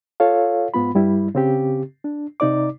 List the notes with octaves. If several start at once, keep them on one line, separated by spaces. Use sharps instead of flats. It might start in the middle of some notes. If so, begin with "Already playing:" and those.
F4 A4 C#5 F5
G#2 B3 F4 B5
G2 G3 E4
C#3 C4 G4
D4
C3 D#4 D5 D6